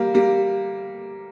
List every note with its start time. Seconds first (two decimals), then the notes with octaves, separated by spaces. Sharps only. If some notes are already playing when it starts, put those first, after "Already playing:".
Already playing: G3 A#3
0.14 G3 A#3